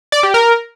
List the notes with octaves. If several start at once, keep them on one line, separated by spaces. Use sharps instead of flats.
D5
G4
A#4